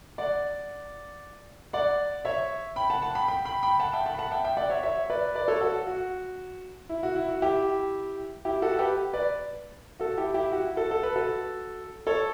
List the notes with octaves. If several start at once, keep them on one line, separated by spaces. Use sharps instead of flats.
D5 F#5
D5 F#5
C#5 E5
G5 B5
F#5 A5
F#5 A5
G5 B5
G5 B5
G5 B5
G5 B5
F#5 A5
E5 G5
F#5 A5
B5
F#5 A5
E5 G5
E5 G5
D5 F#5
C#5 E5
C#5 E5
B4 D5
B4 D5
A4 C#5
F#4 A4
F#4
E4
F#4
E4
F#4
E4 G4
E4 G4
F#4 A4
G4 B4
B4 D5
F#4 A4
E4 G4
E4 G4
F#4
E4
F#4 A4
A4
B4
F#4 A4
A4 C#5